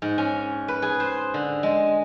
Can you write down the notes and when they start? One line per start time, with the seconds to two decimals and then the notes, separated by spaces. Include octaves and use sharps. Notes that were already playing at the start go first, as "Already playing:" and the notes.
0.02 G#2
0.18 C#4
0.68 B4
0.82 G#4
1.00 C5
1.34 D3
1.63 G#3